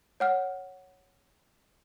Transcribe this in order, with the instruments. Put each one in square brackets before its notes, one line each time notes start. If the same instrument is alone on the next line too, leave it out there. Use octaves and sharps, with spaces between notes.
[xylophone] C#5 F#5 F6